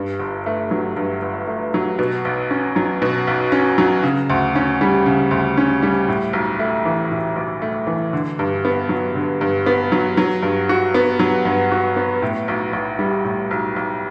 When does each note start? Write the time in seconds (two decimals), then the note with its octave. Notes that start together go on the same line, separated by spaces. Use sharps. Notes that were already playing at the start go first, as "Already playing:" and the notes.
Already playing: G2
0.19 G1
0.46 A3
0.71 F#3
0.96 G2
1.22 G1
1.47 A3
1.74 F#3
1.99 B2
2.25 B1
2.50 C#4
2.76 F#3
3.02 B2
3.27 B1
3.52 C#4
3.78 F#3
4.03 C#3
4.30 D2
4.55 C#4
4.81 G3
5.06 C#3
5.31 D2
5.57 C#4
5.83 G3
6.08 A2
6.33 B1
6.59 A3
6.85 E3
7.11 A2
7.36 B1
7.62 A3
7.87 E3
8.13 D3
8.39 G2
8.65 B3
8.89 F#3
9.15 D3
9.41 G2
9.66 B3
9.92 F#3
10.17 F#3
10.43 G2
10.69 F#4
10.94 B3
11.19 F#3
11.45 G2
11.72 F#4
11.96 B3
12.22 A2
12.48 B1
12.73 B1
12.99 G3
13.24 A2
13.51 B1
13.76 B1